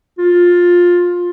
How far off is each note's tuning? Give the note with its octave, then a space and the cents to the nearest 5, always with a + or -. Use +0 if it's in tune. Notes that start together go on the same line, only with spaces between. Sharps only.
F4 +15